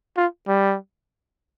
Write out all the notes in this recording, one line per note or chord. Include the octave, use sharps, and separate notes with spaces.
F4
G3